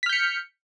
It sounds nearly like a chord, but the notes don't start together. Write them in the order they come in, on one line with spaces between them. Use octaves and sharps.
B6 F6 G6 C#7